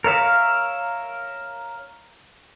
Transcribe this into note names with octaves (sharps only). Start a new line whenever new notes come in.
A#4 C#5 E5 F5